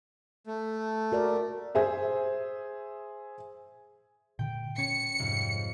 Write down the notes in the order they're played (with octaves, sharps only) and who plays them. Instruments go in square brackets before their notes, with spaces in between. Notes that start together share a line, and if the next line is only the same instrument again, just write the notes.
[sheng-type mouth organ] A3
[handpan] F#4 A#4 D5
[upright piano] G#4 C5 E5
[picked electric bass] A#2 D3 [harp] G5
[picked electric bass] C#4 [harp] C#5 [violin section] C#7
[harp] F2 G#2 C3